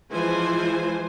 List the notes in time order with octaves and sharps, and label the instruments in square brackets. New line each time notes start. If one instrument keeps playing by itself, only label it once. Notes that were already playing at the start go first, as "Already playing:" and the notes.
[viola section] E3 F3 G#3 C5 G#5